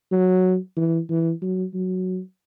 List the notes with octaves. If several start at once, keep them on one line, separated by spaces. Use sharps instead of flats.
F#3
E3
E3
F#3
F#3